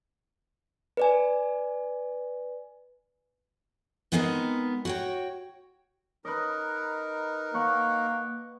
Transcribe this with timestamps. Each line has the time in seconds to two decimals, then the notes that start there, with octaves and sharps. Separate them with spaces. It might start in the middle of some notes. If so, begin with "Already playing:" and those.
0.97 B4 D5 G#5
4.12 G#3 B3 C4 D#4 G#4 A#4
4.85 F#4 C#5 G5
6.25 D#4 A#4 B4 D#5
7.54 A#3 F#5 C#6